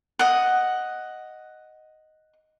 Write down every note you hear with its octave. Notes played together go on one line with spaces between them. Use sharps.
D#5 F#5